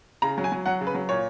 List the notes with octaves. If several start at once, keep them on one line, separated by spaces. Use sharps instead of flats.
C#3 A#5
F#3
G#5
F#3
F#3 F#5
C#3
B4
F#3
A#2 C#5